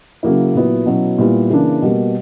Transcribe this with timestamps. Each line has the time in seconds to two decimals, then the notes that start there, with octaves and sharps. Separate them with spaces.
0.23 C#3 F#3 A#3 E4
0.54 A#2 F#3 B3 E4
0.86 B2 F#3 C#4 E4
1.18 A#2 G3 B3 E4
1.50 C#3 E3 A#3 D4
1.82 B2 G3 A#3